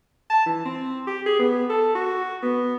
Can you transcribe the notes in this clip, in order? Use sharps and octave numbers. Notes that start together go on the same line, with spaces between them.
A5
E3
C4
G4
G#4
B3
A4
F#4
B3